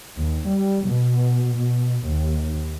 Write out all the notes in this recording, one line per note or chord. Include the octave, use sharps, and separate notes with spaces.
D#2
G3
B2
B2
D#2